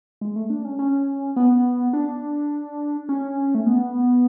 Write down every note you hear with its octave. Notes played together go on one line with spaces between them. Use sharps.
G#3
A3
D4
C#4
C#4
B3
D4
C#4
A3
B3